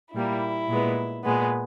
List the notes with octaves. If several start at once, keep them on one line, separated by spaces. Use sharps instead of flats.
A#2 G3 A#3 E4
A#2 G#3 B3
A#2 G#3 B3